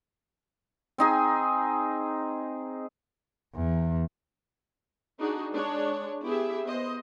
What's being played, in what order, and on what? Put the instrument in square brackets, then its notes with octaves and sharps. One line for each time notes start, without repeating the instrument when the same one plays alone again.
[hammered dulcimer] C4 D#4 G#4
[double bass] E2
[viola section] D4 D#4 F#4 G#4
G#3 D4 C#5
B3 E4 G4 G#4 E5
B3 C5 D#5